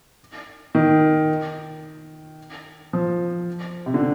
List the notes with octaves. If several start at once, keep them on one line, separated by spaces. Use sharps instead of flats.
D#3
F3
C3
D3